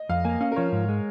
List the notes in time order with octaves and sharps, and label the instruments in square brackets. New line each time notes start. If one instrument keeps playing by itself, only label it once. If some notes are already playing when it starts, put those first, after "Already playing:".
Already playing: [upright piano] D#5
[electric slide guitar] F2 [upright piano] F5
[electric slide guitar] A#3 [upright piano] G#5
[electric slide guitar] C#4 [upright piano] F5
[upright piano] A#4
[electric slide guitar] F3 [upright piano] C#5
[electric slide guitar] G#2
G#3